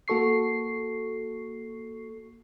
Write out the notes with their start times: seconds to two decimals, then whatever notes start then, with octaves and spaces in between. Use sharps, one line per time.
0.08 A#3 F#4 A4 C#6 C7